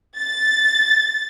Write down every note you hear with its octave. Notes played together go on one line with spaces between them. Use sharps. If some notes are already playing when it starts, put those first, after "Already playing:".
A6